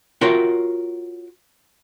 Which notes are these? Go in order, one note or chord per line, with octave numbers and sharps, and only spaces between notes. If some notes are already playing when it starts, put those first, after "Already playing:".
F4 F#4 A#4 C#5 E5 G5